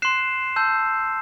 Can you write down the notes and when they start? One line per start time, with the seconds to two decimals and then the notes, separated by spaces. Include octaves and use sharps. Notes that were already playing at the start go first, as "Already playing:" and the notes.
0.02 C6 F#6 C7 E7
0.56 A5 E6 G6